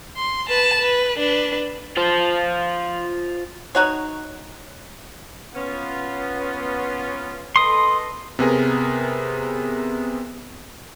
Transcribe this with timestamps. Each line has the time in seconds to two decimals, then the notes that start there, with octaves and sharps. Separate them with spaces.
0.17 C6
0.49 B4 A5
0.81 B4
1.19 D4 B4
1.97 F4 C5
3.75 D#4 F#4 C#5
5.54 B3 C#4 F4
7.56 A4 B4 D#5 C6 D#6
8.39 C3 B3 G#4 A#4